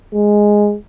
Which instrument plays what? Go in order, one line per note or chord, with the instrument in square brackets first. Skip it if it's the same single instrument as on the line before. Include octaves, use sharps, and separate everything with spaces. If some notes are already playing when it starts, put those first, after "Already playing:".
[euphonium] G#3